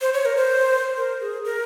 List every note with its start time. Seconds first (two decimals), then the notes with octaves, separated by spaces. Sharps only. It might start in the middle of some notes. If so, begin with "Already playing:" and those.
0.01 C5
0.14 C#5
0.25 A#4
0.37 C5
0.97 A#4
1.21 G#4
1.45 A#4